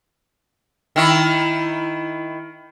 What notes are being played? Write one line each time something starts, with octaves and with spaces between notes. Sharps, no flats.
D#3 E4